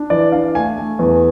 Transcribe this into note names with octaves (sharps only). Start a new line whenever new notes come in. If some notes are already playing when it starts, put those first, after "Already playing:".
Already playing: D4
E3 D5
D4 F5
A3 G#5
A3
E2